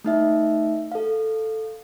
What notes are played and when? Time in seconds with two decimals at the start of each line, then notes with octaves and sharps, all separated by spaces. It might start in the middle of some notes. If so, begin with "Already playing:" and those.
0.04 A3 D#4 E5
0.92 A4 F5